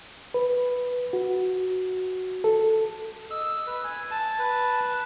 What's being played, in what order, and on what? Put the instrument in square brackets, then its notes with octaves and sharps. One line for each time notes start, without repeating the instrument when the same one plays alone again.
[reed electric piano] B4
F#4
A4
[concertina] D#5 [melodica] E6
[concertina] B4
G#5
[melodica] A5
[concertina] B4